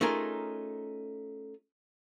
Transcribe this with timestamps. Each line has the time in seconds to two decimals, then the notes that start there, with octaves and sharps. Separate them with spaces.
0.01 A3 C#4 D#4 F4 G#4 A#4